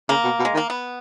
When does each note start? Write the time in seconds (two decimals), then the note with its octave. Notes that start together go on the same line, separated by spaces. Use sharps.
0.09 C#3 A#3
0.24 B2
0.39 B2
0.45 G#3
0.54 D#3
0.57 A#3
0.70 B3